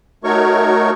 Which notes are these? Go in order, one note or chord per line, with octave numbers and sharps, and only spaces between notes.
A3 D#4 F#4 A#4 C#5 C#6